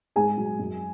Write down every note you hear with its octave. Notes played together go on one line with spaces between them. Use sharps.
G#2 G#4 G#5
F#3
F#2